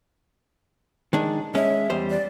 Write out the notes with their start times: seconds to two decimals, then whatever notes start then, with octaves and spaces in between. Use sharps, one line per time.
1.13 D#3 G#3 D4
1.55 G#3 C#4 E5
1.90 E2 G3 C5
2.10 D5